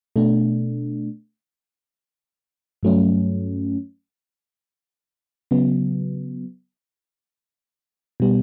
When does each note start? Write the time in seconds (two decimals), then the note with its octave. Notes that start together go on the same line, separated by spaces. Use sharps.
0.16 B2 A3 D4
2.83 G2 F#3 A3 C#4
5.51 C#3 F#3 B3
8.20 B2 G3 B3